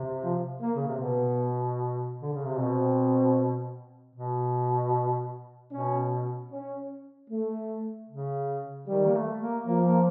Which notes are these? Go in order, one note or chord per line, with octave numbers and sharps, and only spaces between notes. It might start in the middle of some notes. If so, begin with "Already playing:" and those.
Already playing: C3
F3
A#3
C#3
C3
B2 B3
D3
C#3
C3
B2 C4
B2
B2 C#4
C#4
A3
C#3
D#3 G3
A#3
A3
A#3
F3 A#3
A#3